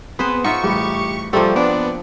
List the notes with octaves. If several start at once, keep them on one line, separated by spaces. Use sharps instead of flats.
B3 C4 G#4 B4 C5
D#4 F4 E5 F#5 C#6
A1 G3 G4 B5
F3 G3 A3 A#3 C4 G4 D5
B3 D4